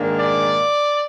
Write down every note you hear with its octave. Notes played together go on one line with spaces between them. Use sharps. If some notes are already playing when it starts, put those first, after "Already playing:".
Already playing: G#2 D#3 A#3 D4
D5